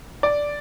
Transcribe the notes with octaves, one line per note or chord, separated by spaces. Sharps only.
D5